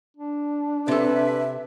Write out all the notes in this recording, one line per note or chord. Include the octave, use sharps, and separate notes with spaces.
D4
C3 A4 B4 E5